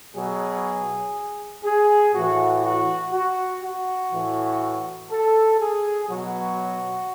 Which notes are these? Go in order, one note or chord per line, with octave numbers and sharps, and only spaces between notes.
B2 F#3 G#4
G#4
A2 E3 F#4
F#4
F#4
F#4
A2 E3
A4
G#4
B2 F#3 F#4